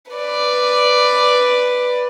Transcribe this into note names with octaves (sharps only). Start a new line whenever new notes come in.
B4 D5